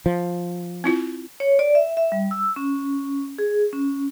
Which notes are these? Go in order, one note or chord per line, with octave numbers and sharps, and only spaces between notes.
F3
C4 E4 F4
C#5
D5
E5
E5
G3
E6
C#4
G#4
C#4